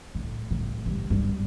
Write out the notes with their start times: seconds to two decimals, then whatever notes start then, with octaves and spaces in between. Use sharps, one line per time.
0.15 A2
0.51 A2
0.86 G2
1.10 G2